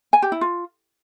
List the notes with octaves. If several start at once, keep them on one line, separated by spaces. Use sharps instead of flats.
G#5
G4
E4
F4